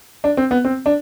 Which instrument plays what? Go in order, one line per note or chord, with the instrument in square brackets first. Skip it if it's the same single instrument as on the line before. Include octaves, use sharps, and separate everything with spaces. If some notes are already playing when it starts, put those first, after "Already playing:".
[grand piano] D4
C4
B3
C4
D4